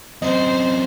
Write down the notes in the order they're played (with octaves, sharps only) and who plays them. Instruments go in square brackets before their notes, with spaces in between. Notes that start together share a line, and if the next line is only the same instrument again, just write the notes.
[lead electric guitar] F#2 C4 [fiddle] C5 [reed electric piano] D#5